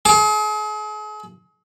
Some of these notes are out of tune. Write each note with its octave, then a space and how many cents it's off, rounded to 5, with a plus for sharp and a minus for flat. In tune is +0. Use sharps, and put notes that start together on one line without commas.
G#4 +40 D6 +0